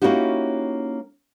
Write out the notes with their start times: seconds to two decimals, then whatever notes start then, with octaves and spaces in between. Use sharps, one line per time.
0.02 A#3 C#4 D#4 E4 F#4 G4